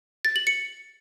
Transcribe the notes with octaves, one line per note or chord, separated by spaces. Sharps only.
A6
F#7
C#7